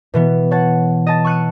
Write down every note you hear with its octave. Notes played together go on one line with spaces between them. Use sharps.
B2 E3 B3
C#5 F#5 A5 A6 C#7
D#5 A5 A6
C#6 E6 F#6 C#7 D#7